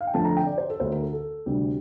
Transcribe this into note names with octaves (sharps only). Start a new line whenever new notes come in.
F5
G5
F2 D3 F3 A3 C4 A5
A#5
G5
D5
C5
A4
D2 D3 A3 C5
A#4
A4
A4
D2 C3 G3 D4 G4